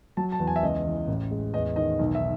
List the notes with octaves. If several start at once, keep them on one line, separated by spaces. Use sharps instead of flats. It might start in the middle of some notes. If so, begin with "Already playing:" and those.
F#3 A5
A5
E2
G#5
E5
C#2 D#5
E3
A1
G#3
E2 D#5
D#3 D#5
B1
E5